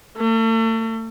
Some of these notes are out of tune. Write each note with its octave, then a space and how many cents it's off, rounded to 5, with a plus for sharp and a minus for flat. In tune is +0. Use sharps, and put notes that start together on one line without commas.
A3 +40